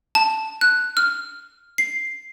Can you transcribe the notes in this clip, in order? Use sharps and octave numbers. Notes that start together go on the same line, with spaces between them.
A5
F#6
F6
C7